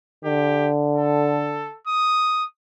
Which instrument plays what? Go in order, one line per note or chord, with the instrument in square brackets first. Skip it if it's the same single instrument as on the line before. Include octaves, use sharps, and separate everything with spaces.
[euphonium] D3 [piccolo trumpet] G4
[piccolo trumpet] A4
D#6